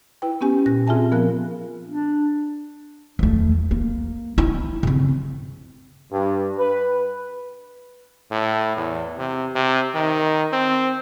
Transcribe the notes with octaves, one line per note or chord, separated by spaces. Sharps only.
E4 B4 G5
B3 C#4 G4 G#5
A#2 F#6 A#6
C4 F4 G#4 E5 G#5 A5
F3 B3 A#4 F5 F#6
D4
E2 A3
A#3
E4
C#3 C4
G2
B4
A2
E2
C3
C3
D#3
C4